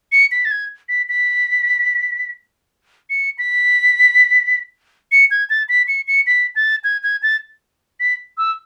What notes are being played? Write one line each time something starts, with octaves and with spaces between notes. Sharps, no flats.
C#7
B6
A6
G#6
B6
B6
C#7
B6
C#7
G#6
A6
B6
C#7
C#7
B6
A6
G#6
G#6
A6
B6
E6